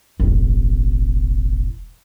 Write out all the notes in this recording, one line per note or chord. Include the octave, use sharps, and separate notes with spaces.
E1 A1